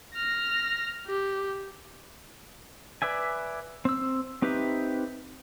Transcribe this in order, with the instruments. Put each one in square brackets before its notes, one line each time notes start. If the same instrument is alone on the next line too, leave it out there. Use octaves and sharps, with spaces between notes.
[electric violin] F6 A#6
G4
[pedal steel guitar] B4 D5 E5 G#5
C4 E6
C4 D#4 G4 B4 E5